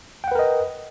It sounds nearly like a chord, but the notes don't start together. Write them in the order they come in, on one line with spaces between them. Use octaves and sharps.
G5 F#5 B4 A#4 D#5